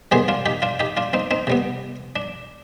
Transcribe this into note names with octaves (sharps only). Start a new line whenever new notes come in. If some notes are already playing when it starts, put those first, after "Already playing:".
C3 D#3 G3 B3 G#4 C5
D4 F4
D#4 G4
D4 F4
D#4 G4
D4 F4
C4 D#4
C4 D#4
C3 G3 B3
D4